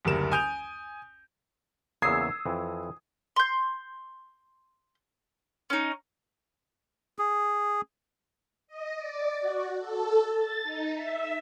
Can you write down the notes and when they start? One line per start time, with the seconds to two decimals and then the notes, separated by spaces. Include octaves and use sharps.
0.05 F#1 D2 G3 A#4 E7
0.32 G#5 D#6 G6 D7 F7
2.02 E2 C#3 A#3 D#6 E6 G#6 C7
2.46 F2 E3
3.36 C6 G6
5.70 C#4 D#4
7.19 G#4
8.67 D#5
8.96 D5
9.39 F#4
9.78 A4
10.32 A6
10.63 D#4
10.93 E5